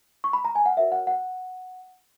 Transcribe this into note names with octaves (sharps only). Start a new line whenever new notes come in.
C#6
B5
A#5
G#5
F#5
F#4 A#4 C#5 E5
F#5
F#5